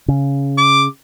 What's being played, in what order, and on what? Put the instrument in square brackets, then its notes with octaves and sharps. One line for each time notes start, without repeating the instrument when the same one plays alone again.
[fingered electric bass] C#3
[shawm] D6